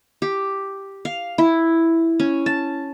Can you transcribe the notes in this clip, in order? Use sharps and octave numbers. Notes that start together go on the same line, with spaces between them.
G4
F5
E4
C#4
A5